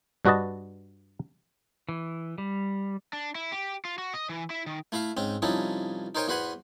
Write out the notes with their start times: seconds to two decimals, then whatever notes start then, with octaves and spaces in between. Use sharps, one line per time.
0.25 G2 D4 F#4 B4 D#5 A5
1.89 E3
2.38 G3
3.13 D4
3.35 E4
3.52 G4
3.85 F4
3.98 F#4
4.14 D#5
4.29 E3
4.50 E4
4.67 D#3
4.92 A3 E4 E5 F5
5.17 G#2 C4 C#4
5.42 C2 F3 C#4 D#4 E4 A4
6.15 D#4 A#4 C5 C#5 G5 G#5
6.28 E2 F#4 B4 C5 F#5 G#5